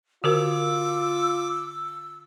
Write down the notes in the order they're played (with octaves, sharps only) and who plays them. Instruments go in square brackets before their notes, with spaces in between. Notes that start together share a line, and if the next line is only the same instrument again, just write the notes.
[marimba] D3 F#4 A#4 [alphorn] F4 [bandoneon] D6 [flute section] E6